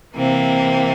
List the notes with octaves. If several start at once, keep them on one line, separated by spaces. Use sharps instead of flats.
C3 E3 A#3 C4